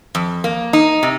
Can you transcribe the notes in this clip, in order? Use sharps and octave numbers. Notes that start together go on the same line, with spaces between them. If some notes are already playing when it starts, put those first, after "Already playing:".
F2
A#3
D#4
C3